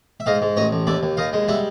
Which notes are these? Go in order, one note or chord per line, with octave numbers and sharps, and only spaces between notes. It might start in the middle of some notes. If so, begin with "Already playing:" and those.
E5
G#2 D#5 F5
G#2
A1 C#5 D#5
A1
D#2 D5 E5
D#2
D#2 D#5 F5
G#3
G3 E5 F#5